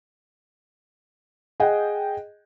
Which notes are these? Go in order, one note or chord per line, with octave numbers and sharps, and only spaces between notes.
G#4 D#5 F#5 G5